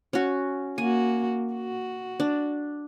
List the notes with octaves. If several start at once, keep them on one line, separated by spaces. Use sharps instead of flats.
C#4 F#4
A#3 F#4 G#5
F#4
D4